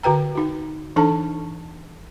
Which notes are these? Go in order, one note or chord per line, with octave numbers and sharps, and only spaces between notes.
D3 F#4 B4 G5 A#5
D#4 F#4
E3 D4 D#4 A4 A5